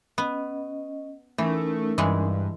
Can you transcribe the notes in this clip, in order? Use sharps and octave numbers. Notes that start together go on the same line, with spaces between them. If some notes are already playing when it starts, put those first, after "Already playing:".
B3 C#4 D#5
E3 A3 C#4 D#4 A#4
G2 E3 G#3